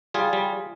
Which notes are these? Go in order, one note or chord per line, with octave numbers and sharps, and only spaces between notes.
G3 F4 G#4
G3